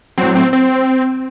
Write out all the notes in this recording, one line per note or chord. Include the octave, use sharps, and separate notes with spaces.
A2 F#3 C4
C4
C4